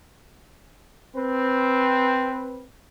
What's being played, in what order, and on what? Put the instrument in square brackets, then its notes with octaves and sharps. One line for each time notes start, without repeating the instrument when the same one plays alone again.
[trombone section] C4 B4